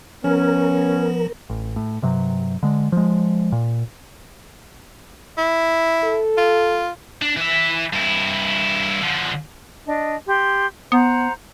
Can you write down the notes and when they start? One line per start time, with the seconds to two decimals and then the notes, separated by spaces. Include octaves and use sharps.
0.24 F3 B3 C#4 A#4
1.50 A1
1.76 A2
2.02 G2 C3 F#3
2.63 D3 G#3
2.92 F3 G#3
3.52 A#2
5.38 E4
6.04 A4
6.38 F4
7.22 D4
7.37 E3 E5
7.93 G2 E4
9.02 D3 F3
9.85 D4 D#5
10.26 G4 C6
10.92 B3 C5 F#5 A#5